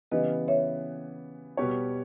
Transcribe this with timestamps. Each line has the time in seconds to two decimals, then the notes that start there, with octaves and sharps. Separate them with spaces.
0.12 C#3 E3 G3 B3 B4 D#5
0.48 C#5 E5
1.57 B2 G3 B3 G4 C#5